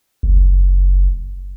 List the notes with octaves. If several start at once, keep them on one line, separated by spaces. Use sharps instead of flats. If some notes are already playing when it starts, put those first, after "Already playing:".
F#1